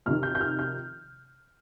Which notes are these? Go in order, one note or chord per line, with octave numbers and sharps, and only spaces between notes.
F2 C3 D#3 F6
G6
G6
F6
G6